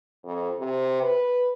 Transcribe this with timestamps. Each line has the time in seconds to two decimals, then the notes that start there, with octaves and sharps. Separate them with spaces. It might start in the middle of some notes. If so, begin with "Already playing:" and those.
0.25 F2
0.59 C3
1.02 B4